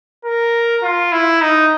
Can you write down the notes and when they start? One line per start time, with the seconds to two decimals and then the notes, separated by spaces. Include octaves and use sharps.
0.25 A#4
0.83 F4
1.12 E4
1.41 D#4